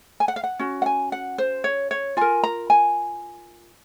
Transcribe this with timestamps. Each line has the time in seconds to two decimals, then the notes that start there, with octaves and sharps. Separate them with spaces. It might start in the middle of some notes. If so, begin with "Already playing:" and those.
0.20 G#5
0.28 F#5
0.36 F5
0.44 F#5
0.59 C#4 F#4
0.82 F#5
0.86 G#5
1.12 F#5
1.38 C5
1.64 C#5
1.91 C#5
2.17 F4 A#4 G#5
2.44 A#5
2.70 G#5